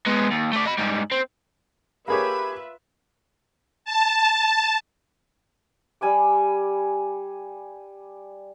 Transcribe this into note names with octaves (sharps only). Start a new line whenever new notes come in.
G#3 B3
D#2
A3 D5
D#5 B5
G#2 G3
C4
A#3 F4 G4 G#4 B4 C#5 E5 B5
A5
G3 G#5 B5 D6